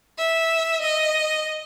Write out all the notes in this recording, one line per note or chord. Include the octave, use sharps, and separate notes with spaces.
E5
D#5